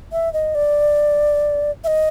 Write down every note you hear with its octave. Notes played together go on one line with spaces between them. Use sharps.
E5
D#5
D5
E5
D#5